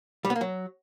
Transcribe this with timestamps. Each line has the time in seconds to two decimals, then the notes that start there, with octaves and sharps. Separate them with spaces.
0.25 G3
0.30 B3
0.35 A#3
0.41 F#3